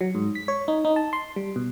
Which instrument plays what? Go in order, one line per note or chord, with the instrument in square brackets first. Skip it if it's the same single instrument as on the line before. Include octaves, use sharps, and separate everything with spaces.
[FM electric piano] F#3
G#2
B6
C#5
D#4
D#4
A5
C6
G3
B2